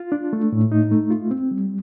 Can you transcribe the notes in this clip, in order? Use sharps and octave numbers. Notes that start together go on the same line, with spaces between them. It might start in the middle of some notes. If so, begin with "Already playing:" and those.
Already playing: F4
D4
A3
A2
D#4
A3
F4
C4
G3